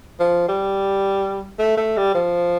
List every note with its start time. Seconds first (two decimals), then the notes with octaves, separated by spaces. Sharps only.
0.20 F3
0.48 G3
1.59 A3
1.77 A3
1.97 G3
2.14 F3